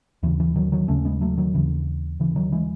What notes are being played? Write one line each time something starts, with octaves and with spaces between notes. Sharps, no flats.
D#2 C#3 E3
E3
D#3 F#3
D#3 F#3
D#2 C#3 A3 C#4
G#3 B3
F#3 A3
D#3 F#3
D#2 C#3 E3
D#2 C#3 E3
D#3 F#3
E3 G#3